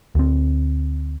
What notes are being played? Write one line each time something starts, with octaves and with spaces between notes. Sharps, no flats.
D2 C4